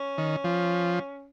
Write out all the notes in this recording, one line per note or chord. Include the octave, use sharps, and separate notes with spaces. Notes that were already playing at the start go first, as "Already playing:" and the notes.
Already playing: C#4
D#3
F3